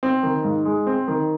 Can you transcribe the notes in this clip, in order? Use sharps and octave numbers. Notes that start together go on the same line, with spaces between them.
C4
D#3
G#2
G#3
C4
D#3